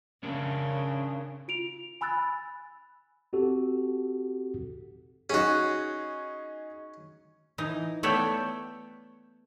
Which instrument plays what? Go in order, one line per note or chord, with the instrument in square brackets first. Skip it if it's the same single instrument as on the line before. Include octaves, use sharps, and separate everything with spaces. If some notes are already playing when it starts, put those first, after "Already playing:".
[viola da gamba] C#3 [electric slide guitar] C#4 D4 A#4
[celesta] F4 D7 F7
G#5 B5 E6 F#6 A6
[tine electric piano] C4 F#4 G4 A4
[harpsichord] C#4 F#4 [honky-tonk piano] D#4 G#4
[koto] E3 D#4
A3 B3 C#5 D5 E5 G5